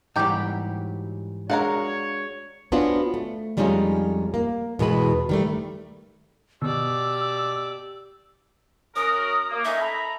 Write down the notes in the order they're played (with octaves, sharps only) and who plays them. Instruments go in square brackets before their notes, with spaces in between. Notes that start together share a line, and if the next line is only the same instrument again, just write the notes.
[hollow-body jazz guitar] G#2 E3 G3 [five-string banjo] F#3 G4
[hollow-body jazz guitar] G#3 D4 F#4 [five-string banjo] A#4 F5 F#5 [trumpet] C#5
[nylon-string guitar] B3 C#4 D4 F4 F#4 C5
A3
F2 G3 G#3 C#4 D#4 F4
A#3
E2 B2 G#3 B4
D#3 G3 A3
[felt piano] B2 [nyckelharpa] G4 D5 [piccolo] E6
[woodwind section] F#2 F#4 A#4 [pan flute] D#6
[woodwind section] A#3
[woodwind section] A3 C#4 D#4 [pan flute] E5
[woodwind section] A4 A#5 B5